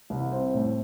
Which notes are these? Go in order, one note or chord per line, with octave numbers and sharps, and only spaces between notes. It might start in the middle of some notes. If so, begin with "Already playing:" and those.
C2
C4
A2